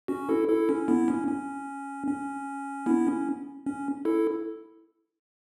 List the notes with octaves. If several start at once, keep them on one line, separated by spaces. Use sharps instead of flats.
C#4 F#4
E4 A4
E4 A4
C#4
B3 E4
C#4
C#4
C#4
B3 E4
C#4
C#4
E4 A4